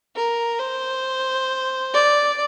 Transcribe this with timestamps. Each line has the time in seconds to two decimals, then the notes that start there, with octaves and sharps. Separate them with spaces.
0.16 A#4
0.59 C5
1.94 D5